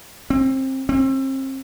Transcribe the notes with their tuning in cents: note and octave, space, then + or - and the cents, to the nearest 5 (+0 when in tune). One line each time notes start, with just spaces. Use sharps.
C4 +25
C4 +35